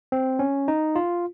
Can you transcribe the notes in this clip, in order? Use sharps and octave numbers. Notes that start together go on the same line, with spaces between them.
C4
C#4
D#4
F4